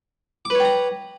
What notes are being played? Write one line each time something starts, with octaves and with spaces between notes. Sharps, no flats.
B4 C#5 G5 A#5 D6